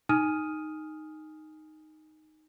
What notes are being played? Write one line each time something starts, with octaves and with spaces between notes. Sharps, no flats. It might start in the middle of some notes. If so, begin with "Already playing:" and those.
D#4 G#5 D#6 F6 D#7